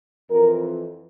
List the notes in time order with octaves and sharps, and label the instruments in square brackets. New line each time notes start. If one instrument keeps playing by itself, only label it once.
[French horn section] F2 E3 A#4